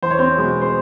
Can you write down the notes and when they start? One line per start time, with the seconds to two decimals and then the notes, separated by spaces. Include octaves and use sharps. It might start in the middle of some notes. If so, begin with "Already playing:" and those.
0.02 E2 C5
0.11 C#5
0.19 C4 C5
0.36 B2 G#3 B3
0.62 C5